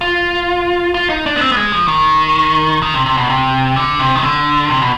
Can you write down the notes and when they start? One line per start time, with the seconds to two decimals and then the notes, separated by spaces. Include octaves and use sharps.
0.01 F4
0.94 F4
1.10 D#4
1.26 D4
1.36 B3
1.41 C4
1.52 B3
1.57 G#3
1.72 F3
1.88 D#3
2.82 D#3
2.94 C3
3.06 C3
3.17 B2
3.30 C3
3.76 D3
3.99 C3
4.16 D#3
4.24 D3
4.70 C3
4.82 B2